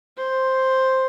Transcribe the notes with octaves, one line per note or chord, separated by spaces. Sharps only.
C5